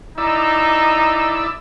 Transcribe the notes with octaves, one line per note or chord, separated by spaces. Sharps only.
D#4 E4 D5 E6